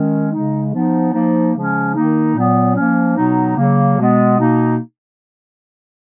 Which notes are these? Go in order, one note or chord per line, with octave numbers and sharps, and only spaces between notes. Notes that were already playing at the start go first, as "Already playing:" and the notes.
Already playing: D#3 G#3 C#4
C#3 G#3 D#4
F3 B3 D#4
F3 A#3 D#4
C#3 F3 G#3 C#4
D#3 A#3 D#4
A#2 F#3 B3
F3 A#3 C#4
B2 F#3 B3 D#4
C#3 F#3 A#3
B2 G#3 B3
B2 A#3 D#4